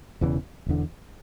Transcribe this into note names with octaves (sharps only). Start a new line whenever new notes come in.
E1 E2 C#3 E3
E1 E2 D3